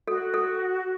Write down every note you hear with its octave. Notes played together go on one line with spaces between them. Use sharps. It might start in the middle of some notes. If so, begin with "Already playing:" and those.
F#4 A4
A4